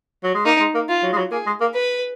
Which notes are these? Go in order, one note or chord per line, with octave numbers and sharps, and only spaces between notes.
F#3
G#3
A#3 D#4
G#3
A#3
F4
F#3
G#3
F#3
A#3 G#4
G#3
A#3
B4